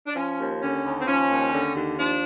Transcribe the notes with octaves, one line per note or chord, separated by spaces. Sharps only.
D4
F3 C#4
D#2
D3 C#4
D#2
C4
F3 C#4
D#2
D3
D#2
F3 D4